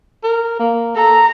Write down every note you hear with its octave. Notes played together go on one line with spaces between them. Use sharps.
A#4
A#3
A4 A#5